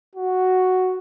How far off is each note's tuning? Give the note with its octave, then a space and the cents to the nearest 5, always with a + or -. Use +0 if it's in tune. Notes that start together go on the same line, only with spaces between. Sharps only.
F#4 +0